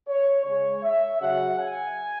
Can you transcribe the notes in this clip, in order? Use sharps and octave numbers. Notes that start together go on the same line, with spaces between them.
C#5
C#3 G#3 C#5
E5
C#3 F#3 F#5
G#5